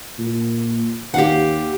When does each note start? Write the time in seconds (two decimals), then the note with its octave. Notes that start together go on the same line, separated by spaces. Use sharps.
0.18 A#2
1.14 D#2 G4 F5 F#5